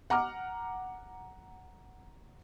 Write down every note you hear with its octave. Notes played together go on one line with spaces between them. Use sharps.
F#5 A#5 D6 F6